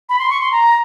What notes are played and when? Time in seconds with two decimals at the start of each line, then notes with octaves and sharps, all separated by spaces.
0.09 B5
0.19 C6
0.30 C#6
0.41 C6
0.52 A#5